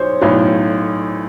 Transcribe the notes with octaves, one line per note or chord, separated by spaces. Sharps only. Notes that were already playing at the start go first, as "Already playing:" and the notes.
Already playing: B1 F#3 C5 C#5
B1 A2 F#3